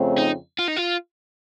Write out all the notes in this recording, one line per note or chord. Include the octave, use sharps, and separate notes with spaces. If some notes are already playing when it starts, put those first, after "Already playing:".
Already playing: F2 C#3 A3 C4
D#4
F4
D#4
F4